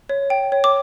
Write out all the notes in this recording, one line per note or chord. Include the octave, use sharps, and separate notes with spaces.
C#5
G5
C#5
D6